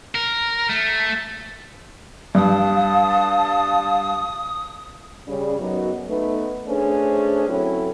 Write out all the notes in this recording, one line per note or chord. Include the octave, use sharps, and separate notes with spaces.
A#4
A3
G2 F5 A5 D#6
C#3 G3
F#2 F#3 B3 D#4 F#4
A3 B3 D#4 B4
A3 C#4 D4 G#4 B4 C5
F#3 C4 C#4 E4 A4